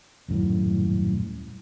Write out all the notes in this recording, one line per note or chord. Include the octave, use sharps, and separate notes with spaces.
D#1 F#2 A2